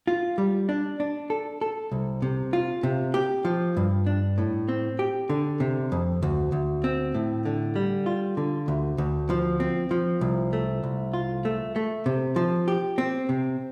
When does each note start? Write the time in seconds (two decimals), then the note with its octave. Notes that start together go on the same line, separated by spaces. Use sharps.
0.07 F4
0.38 G3
0.69 D4
1.00 D4
1.30 A4
1.61 A4
1.92 C2
2.22 C3
2.53 F4
2.83 C3
3.14 G4
3.45 F3
3.77 G2
4.07 D4
4.38 A2
4.69 C4
4.99 G4
5.30 D3
5.60 C3
5.92 F2
6.23 D2
6.52 D2
6.84 C4
7.14 A2
7.45 D3
7.76 G3
8.06 F4
8.37 D3
8.68 D2
8.98 D2
9.30 F3
9.60 C4
9.91 F3
10.21 C2
10.53 A3
10.84 C2
11.14 F4
11.45 A3
11.76 A3
12.06 C3
12.36 F3
12.68 G4
12.98 C4
13.29 C3